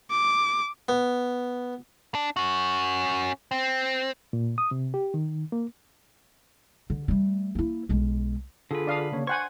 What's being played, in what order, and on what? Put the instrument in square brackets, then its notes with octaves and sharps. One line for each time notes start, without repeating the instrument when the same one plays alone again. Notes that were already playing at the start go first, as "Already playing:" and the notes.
[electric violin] D6
[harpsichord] B3
[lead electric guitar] D4
C#4 F#4
C4
[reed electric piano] A#2
D#6
C3
G4
D#3
A#3
[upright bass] D3
G3 A3
A#3 E4
B1 G#3
[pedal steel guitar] D3 B4 [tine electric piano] F4 G#4 A4
[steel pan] D4 F5 D#6
[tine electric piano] C#3 A#3 C#5
[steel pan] C5 F#5 G#5 [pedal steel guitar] C#6 [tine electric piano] G#6